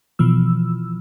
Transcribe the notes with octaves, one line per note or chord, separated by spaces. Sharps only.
B2 E3 F3 E6